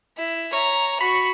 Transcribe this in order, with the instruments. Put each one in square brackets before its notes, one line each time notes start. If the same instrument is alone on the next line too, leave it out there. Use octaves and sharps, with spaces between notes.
[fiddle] E4
[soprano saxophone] C#5 [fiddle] A#5
[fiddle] F#4 C#6 [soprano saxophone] B5